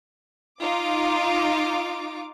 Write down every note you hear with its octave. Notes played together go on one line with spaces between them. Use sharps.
D#4 F4 D6